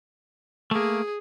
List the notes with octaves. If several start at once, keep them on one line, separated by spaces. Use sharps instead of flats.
A3 A#3 G#4